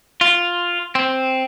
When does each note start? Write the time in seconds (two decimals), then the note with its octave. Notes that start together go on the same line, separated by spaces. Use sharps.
0.21 F4
0.95 C4